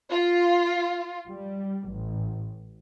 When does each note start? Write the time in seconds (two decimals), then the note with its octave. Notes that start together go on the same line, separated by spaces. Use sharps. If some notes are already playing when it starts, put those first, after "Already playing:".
0.11 F4
1.28 G3
1.89 A1